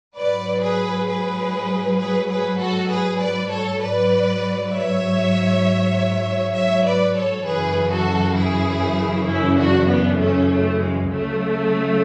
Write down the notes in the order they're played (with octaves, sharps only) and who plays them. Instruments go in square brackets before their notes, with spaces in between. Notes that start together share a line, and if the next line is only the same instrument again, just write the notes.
[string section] G#2 F#3 B4 D5
G#4 B4
G#4 B4
G#4 B4
G#4 B4
F#4 A4
G#4 B4
B4 D5
A4 C#5
G#2 F#3 B4 D5
C#5 E5
C#5 E5
B4 D5
A4 C#5
F#2 C#3 E3 G#4 B4
F#4 A4
E4 G#4
C#4 E4
D4 F#4
B3 D4
A3 C#4
A3
G#3
D2 C#3 F#3 A3